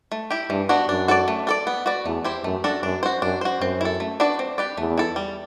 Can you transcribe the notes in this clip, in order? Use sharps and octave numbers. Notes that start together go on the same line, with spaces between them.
A3
E4 G4
G2 E3
B3 D4 F#4
F#2 D4
F#4 A4 D5
A3
D4 A4 D5
B3
F#4 B4 D5
E2 A3
E4 G4 C5
F#2 A3
D4 F#4 A4
F#2 D4
F#4 C5
F#2 D4
F#4 C5
F#2 C4
E4 A4
A3
D4 F#4 B4 D5
C4
G4 B4 D5
E2 A3
E4 A4
G3